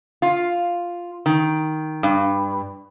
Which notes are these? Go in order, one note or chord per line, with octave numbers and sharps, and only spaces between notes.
F4
D#3
G2